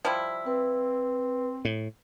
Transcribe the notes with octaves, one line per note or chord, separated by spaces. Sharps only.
F3 G3 E4
C4 B4
A2